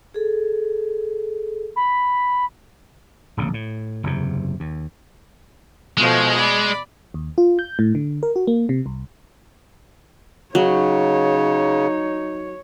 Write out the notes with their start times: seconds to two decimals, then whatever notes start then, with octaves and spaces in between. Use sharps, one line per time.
0.14 G#4 A4
1.76 B5
3.37 D1 A#1 C#3
3.54 A2
4.04 F#1 E2 C3
4.60 D#2
5.98 B2 F3 G#3 A3
6.36 D5 B5
7.14 D#2
7.38 F4
7.59 G6
7.79 A2
7.95 D3
8.23 A#4
8.36 F#4
8.47 A#3
8.69 C3
8.86 C2
10.55 C#3 F#3 D#4 C#5